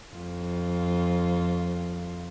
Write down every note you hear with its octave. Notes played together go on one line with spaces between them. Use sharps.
F2 F4